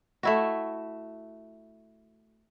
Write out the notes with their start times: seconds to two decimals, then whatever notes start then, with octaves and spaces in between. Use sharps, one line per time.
0.23 A3 E4 F#4